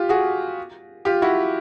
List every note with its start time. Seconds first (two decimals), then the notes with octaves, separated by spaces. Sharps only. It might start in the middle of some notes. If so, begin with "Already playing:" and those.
Already playing: F4 G4
0.09 F#4 G#4
1.05 F4 G4
1.22 E4 F#4